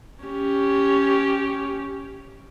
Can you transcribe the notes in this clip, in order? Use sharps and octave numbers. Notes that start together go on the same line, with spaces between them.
C#4 G4